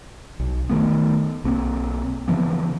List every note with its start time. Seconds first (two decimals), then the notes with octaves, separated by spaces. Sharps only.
0.40 B1
0.69 D#3 A3 B3
1.44 B1 A#3 C4
2.28 C#3 E3 F3 B3